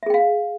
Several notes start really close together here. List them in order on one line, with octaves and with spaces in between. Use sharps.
E5 G#4 G5 F5